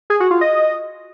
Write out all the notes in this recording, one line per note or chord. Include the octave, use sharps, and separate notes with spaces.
G#4
F#4
F4
D#5